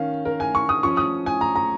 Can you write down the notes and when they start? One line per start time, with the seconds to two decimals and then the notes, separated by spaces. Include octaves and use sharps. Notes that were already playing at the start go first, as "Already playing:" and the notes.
Already playing: D#3 C#4 F5
0.25 A#4
0.40 G#5
0.55 C#6
0.69 D#6
0.83 F3 C#4 C#6
0.97 D#6
1.26 G#5
1.41 A#5
1.56 A#5